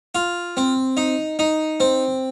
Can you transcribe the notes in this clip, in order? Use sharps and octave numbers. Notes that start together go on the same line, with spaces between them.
F4
C4
D#4
D#4
C4